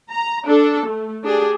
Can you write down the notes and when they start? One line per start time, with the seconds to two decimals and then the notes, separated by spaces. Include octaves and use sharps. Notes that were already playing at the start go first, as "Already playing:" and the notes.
0.11 A#5
0.46 D4 A4
0.87 A3
1.24 D4 G4 G#4